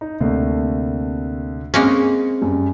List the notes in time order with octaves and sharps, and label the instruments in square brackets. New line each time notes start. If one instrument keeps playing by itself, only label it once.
[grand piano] D#4
[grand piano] D2 A3 [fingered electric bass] C3 A#3
[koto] G#3 A#3 C#4 [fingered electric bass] C4
[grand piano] F#2 G3